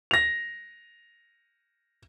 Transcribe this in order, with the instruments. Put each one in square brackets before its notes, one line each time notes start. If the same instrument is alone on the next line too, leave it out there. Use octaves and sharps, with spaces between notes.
[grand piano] A#6 F7